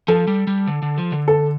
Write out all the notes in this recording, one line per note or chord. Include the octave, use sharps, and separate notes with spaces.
F3 A4
G3
G3
D3
D3
F3
D3
A4